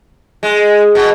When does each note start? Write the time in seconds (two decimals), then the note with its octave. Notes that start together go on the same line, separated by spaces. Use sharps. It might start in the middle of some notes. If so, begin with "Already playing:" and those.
0.43 G#3
0.95 B2